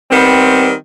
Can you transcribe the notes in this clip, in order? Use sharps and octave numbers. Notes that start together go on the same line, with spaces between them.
D#3 G3 B3 C4